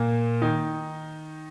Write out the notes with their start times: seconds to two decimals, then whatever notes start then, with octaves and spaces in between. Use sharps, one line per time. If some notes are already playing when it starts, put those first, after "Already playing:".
Already playing: A#2 A#3
0.42 D#3 D#4